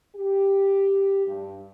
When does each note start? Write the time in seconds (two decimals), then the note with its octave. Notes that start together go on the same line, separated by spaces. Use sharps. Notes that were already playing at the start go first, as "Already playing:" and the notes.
0.16 G4
1.26 G2